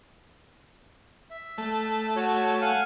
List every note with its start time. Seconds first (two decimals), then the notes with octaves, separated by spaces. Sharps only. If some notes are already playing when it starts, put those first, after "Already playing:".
1.31 E5
1.58 A3
2.16 F#4 C#5
2.62 F5 F#5 G#5